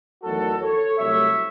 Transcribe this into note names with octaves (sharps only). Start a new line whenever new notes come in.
E2 D#3 F#3 A3 F#4 A4
A4 C#5
C2 C3 F#3 A3 C#5 E5